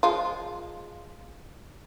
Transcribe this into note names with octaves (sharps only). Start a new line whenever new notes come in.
F3 G#3 F4